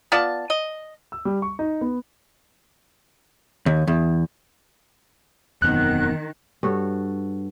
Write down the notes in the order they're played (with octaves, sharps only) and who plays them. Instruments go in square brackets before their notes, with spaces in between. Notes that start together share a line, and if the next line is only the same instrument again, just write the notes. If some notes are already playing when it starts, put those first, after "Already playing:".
[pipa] B3 F4 D5 A5
D#5
[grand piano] E6
G3
C#6
D#4
B3
[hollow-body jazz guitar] D#2
E2
[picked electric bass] E1 F#2 C4 [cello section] D#3 [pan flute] B3 [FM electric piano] F#6
[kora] G2 F#4 A4 C#5